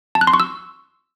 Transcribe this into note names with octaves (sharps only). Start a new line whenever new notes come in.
A5
F#6
C6
C#6
E6